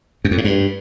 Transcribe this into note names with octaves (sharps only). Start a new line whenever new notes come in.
F#2
F2
G#2
G2